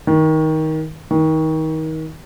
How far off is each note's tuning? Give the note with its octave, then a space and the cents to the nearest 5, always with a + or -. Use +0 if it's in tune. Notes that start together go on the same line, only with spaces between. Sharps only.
D#3 +20
D#3 +30